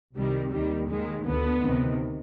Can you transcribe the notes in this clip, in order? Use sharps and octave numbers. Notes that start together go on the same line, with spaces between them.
C2 C3 D#3 G3
D#2 D#3 G3
D#2 D#3 G#3
D2 D3 B3
D2 C3 D#3